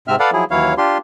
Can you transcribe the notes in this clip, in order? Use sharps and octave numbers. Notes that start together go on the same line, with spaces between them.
G#2 C3 C4 E5 F6
A4 B4 D5 F5 F#5
F3 F#3 E4 G#4
D#2 E3 F#3 E4 C#5 F5
D4 F4 G4 C6